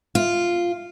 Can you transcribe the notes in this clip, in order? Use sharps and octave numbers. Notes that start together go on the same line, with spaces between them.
F4